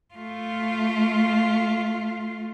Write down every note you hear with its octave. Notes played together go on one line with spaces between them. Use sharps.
A3 F4